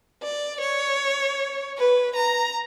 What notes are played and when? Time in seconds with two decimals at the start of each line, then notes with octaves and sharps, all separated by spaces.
0.23 D5
0.61 C#5
1.78 B4
2.16 A#5